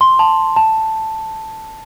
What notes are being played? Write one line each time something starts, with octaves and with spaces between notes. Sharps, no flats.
C6
A5
A5